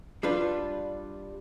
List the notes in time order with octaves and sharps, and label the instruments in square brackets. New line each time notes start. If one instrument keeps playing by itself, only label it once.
[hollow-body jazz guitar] G3 D4 F4 B4